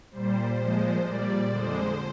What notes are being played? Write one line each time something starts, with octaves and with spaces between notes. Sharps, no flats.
A#2 G3 C5
A#2 F3 G#3
A#2 G3 D5
F2 D3 G#3 C5